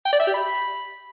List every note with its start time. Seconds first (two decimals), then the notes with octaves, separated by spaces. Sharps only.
0.06 G5
0.13 D5
0.20 E5
0.27 G4
0.34 B5